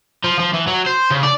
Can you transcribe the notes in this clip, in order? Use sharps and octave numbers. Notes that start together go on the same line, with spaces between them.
F3
F3
E3
F#3
C5
C#3
D5